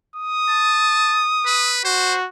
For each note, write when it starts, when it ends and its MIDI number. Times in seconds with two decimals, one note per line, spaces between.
0.16 1.76 87
0.49 1.23 81
1.46 1.84 71
1.85 2.28 66
1.85 2.16 72